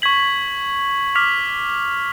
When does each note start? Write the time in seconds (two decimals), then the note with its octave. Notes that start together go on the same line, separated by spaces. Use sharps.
0.02 C#6 G#6 B6 F#7
1.15 D6 F6 B6 F7